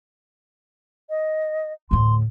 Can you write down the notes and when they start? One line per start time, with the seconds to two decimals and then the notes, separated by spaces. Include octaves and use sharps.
1.10 D#5
1.91 D2 A2 C6